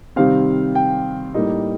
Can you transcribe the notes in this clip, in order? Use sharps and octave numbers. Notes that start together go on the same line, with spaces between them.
C3 D#3 G3 C4 F5
G5
A2 G3 A#3 D#4